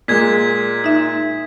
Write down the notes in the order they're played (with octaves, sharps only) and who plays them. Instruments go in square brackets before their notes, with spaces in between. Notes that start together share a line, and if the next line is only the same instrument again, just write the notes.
[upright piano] A#2 G#3 [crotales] G#6 B6
[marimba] D#4 E5